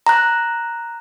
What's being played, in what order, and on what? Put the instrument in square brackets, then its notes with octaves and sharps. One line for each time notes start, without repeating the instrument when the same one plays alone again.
[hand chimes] A#5 F#6